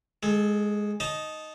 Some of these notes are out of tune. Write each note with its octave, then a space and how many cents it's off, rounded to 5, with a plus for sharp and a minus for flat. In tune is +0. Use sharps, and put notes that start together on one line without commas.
G#3 +0 A4 -25
D#4 +0 D#5 +0 A5 -20